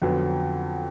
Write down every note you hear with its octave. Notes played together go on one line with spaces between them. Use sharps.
F2 D3 F#3 B3